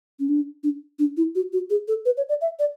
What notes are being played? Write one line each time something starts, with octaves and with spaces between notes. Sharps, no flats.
C#4
D4
D4
D4
E4
F#4
F#4
G#4
A4
B4
C#5
D5
E5
D5